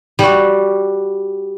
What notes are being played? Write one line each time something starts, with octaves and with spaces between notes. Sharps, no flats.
G3 F#4